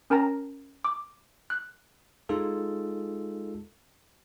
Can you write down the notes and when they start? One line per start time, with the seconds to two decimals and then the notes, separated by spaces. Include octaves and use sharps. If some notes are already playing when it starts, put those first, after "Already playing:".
0.10 C#4 A#4 G5 A5 A#5 A#6
0.85 D6
1.50 F#6
2.29 G#3 D#4 F4 A4